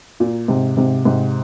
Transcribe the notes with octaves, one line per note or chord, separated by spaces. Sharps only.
A#2
G#2 C3
G#2 C3
G#2 C3